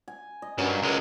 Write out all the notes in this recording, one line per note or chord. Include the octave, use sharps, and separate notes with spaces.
G#5
D#5
G2 F#3 C#4 A#4
C#2 G#3